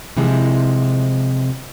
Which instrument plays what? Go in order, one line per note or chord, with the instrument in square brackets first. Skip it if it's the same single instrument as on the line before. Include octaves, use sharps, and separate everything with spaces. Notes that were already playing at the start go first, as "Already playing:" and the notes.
[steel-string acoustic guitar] C3 E3 F3 G#3